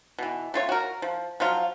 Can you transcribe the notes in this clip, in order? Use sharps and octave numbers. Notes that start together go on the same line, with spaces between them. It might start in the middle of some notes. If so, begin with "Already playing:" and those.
B2 E3
A3 F4 C#5
F#4 A#4
F3
F3 F#3 F4